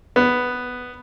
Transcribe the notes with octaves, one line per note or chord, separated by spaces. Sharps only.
B3